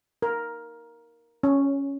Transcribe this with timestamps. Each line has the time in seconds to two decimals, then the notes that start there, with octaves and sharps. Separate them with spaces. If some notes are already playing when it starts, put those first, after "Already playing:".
0.22 A#4
1.43 C#4